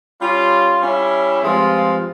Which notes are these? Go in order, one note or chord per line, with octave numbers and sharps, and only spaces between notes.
G3 C#4 F4
G3 C#4 E4
G2 F3 G#3 C4 F4